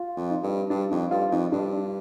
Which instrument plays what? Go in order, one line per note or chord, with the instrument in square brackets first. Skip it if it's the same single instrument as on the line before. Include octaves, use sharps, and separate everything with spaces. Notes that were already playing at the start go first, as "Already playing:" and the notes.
Already playing: [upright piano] F4
[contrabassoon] F2
[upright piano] D#4
[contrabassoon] G2
[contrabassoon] G2 [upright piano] D4
[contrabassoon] F2 [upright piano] D#4
[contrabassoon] G2 [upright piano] F4
[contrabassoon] F2 [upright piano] D#4
[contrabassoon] G2 [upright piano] D4